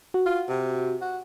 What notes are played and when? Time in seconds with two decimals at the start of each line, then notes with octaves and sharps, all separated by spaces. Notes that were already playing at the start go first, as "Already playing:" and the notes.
0.14 F#4
0.26 F4
0.49 C3
1.01 F#4